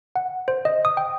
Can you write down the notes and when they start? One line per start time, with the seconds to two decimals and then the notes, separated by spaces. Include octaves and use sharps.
0.16 F#5
0.48 C5
0.65 D#5
0.85 D#6
0.97 G5